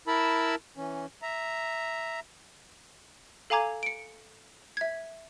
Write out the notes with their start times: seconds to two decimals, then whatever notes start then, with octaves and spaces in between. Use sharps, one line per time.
0.08 E4 A#4 A5 B5 E6
0.77 E3 C#4
1.22 E5 A#5
3.50 A4 F5 G#5 A#5 D6 G#6
3.83 C#7 D7
4.77 E5 G#6